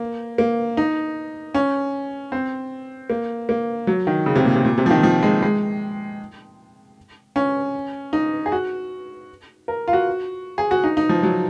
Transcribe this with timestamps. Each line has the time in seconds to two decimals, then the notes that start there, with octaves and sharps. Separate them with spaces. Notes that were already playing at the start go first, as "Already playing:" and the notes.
Already playing: A#3
0.38 A#3
0.77 D#4
1.54 C#4
2.32 C4
3.10 A#3
3.49 A#3
3.87 F#3
4.07 D#3
4.26 C#3
4.35 C3
4.45 A#2
4.56 C3
4.65 A#2
4.78 C3
4.86 F3
4.91 D#3
5.03 F3
5.23 G#3
5.42 G#3
7.36 C#4
8.13 D#4
8.46 G#4
8.52 F#4
9.68 A#4
9.88 F4
9.93 F#4
10.58 G#4
10.71 F#4
10.84 D#4
10.97 D#4
11.09 F3
11.23 F#3